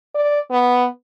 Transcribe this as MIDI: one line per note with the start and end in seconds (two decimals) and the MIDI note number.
0.15 0.39 74
0.51 0.87 59